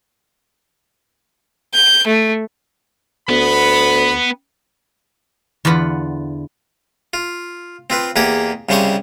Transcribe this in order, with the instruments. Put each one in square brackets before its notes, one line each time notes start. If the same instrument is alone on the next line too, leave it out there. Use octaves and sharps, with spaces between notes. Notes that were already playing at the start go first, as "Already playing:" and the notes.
[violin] G6
A3
[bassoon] D2 [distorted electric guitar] B3 [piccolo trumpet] B5
[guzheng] E2 D3 F4 B4 F#5 B5
[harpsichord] F4
C4 F4 B4
E2 A#3 G4 G#4 D#6
C2 C#3 G3 C5 C#6 D#6